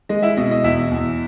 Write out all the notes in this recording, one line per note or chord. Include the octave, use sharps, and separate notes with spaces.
G#3 D#5
E4 E5
B2 D#5
D#5
E2 E4 E5
E2